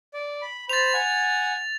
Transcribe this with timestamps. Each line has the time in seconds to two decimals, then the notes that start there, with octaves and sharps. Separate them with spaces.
0.14 D5
0.42 B5
0.69 C5 B5 A6 F7
0.94 F#5 G#5